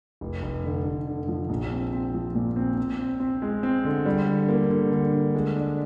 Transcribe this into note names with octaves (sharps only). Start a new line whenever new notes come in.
F1
F1
D3
F1
D3
F3
A#1
C4
C4
F3
A#2
C4
C4
C4
C4
G#3
C4
D3
G3
D3
A#3
D3
D3
D3
G#3
D4